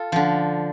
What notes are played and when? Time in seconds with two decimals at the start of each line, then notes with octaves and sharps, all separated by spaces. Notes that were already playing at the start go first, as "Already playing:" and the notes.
Already playing: F4 A4
0.12 D3 F3